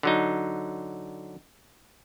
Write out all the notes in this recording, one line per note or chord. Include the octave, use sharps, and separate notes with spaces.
D3 F#3 D#4